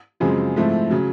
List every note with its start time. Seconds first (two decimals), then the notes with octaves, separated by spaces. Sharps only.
0.20 F#2 C#3 F3 G#3 C4
0.56 G#2 F3 A3 C4 E4
0.91 C#3 F#3